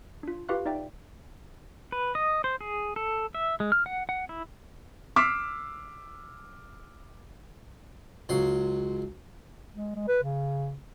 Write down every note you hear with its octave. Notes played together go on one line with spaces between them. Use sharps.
D4 F4
F4 G4 B4 F5 C#6 F#6
D#4 D5 E5 G5
B4
D#5
C5
G#4
A4
E5
G#3
F6
F#5
F#5
E4
D6 E6 F6 B6 C7 E7
C#2 F#3 C6
G#3
G#3
B4
C#3